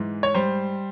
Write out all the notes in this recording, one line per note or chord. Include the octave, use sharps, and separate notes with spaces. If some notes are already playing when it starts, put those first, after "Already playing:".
Already playing: G#2 E3
C#5
G3 C5